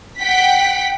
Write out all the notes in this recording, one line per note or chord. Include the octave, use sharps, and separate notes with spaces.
F#5 G5 B6